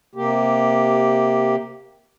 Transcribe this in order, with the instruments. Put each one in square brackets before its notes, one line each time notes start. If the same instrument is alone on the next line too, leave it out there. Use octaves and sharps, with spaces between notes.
[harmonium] C3 A#3 G4